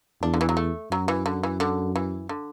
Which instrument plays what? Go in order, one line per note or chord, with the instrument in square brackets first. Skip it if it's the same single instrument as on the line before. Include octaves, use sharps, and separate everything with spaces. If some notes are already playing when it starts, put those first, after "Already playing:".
[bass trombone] E2 [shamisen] D4
[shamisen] D3
E3
F#3
A3
[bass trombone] F#2 [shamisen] F#3
[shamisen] E3
D3
E3
D3
E3
D3